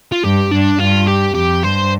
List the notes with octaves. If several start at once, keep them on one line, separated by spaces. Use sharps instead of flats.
F4
G2 G4
G2 D4
G2 F4
G4
F2 G4
G2 C5